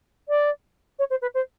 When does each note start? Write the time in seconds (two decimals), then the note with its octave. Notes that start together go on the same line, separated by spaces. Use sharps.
0.29 D5
0.99 C#5
1.10 C5
1.22 B4
1.35 C5